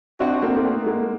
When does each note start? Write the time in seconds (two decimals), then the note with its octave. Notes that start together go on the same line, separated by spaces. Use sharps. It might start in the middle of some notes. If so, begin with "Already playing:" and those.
0.20 C4 D4 F#4
0.42 A#3 C4
0.57 A#3
0.64 A3 B3
0.86 G#3 A#3